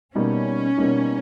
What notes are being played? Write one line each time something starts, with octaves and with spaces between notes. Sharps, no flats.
B2 G3 A#3 C#4 D#4
B2 G3 A#3 D#4